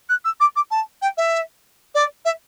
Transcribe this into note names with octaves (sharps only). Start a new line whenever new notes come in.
F#6
E6
D6
D6
A5
G5
E5
D5
E5